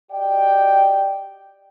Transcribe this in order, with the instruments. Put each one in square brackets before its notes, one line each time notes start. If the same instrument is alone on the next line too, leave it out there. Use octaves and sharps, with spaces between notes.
[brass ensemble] F#4 G4 D5 D#5 G5